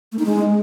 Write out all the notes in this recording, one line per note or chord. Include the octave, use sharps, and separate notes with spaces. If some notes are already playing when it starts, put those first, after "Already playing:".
A3
D#4
G#3